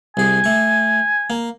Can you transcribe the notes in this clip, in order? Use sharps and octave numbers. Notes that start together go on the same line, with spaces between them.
C2 G#4 G#5
A3 C#6
A#3